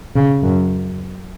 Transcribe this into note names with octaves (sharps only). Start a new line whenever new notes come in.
C#3
F#2